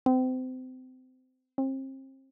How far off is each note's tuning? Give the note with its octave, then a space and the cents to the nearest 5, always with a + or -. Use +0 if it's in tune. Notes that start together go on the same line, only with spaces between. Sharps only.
C4 -30
C4 +35